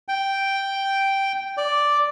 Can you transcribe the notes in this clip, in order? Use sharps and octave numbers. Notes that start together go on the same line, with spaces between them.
G5
D5